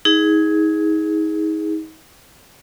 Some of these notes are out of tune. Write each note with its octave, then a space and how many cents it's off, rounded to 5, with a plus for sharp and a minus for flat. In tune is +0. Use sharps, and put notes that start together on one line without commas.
D#4 +35 G#4 +0